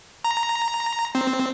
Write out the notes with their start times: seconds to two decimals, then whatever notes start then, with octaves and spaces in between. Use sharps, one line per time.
0.24 A#5
1.15 C4